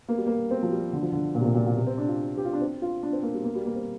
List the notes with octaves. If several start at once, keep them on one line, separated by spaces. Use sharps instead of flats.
A#3
G3
A#3
C4
F3
G3
D3
F3
D3
A#2
C3
A#2
A#2
A#2
C3
C4
D4
F4
G4
F4
D4
C4
F4
D4
C4
A#3
G3
A#3
G3
A#3
C4